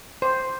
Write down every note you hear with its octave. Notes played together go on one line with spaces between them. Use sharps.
C5